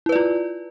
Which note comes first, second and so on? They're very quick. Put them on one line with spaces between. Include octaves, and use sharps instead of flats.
E4 B4 D5 F4